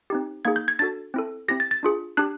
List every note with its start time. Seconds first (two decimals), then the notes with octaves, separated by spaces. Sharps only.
0.10 C4 D#4 G4
0.45 A#3 D#4 G#4 G#6
0.56 G6
0.68 G#6
0.79 D4 F#4 A4 A6
1.14 C4 E4 A4
1.48 C4 E4 G4 A#6
1.60 A6
1.71 A6
1.83 D4 F4 G#4
2.17 D4 G4 F#6